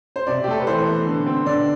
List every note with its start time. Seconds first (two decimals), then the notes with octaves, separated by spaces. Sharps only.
0.16 C5
0.27 C3 D5
0.44 G4
0.47 A3 A4
0.60 B4
0.67 E3 C5
0.87 B3
1.07 D3
1.27 C4
1.46 D3 D5